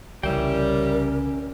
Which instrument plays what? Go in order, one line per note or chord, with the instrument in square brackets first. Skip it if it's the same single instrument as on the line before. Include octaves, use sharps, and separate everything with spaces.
[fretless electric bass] C2 C#3 E3 [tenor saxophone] G3 [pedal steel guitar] C#4 E5 G5 [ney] A#4